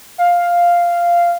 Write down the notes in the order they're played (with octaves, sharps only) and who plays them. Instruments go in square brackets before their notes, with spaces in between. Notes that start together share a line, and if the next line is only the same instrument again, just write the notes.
[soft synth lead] F5